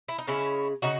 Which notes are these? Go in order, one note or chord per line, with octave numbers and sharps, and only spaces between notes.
E4
D#4
C#3 G#3 C#4 E4
C#3 F#3 D#4 F#4